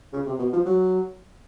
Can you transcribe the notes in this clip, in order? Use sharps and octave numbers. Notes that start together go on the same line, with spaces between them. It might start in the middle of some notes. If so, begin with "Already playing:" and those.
C#3
C3
B2
F3
F#3